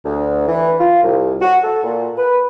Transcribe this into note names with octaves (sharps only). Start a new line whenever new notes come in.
D2
E3
F4
C2
F#4
A4
A#2
B4